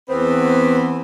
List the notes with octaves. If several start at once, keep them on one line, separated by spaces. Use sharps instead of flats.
E2 B3 C4